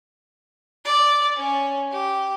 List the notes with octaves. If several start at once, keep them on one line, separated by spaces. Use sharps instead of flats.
D5
C#4
G4